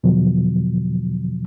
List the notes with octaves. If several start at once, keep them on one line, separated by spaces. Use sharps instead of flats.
E2 B2 D3 F3 F#3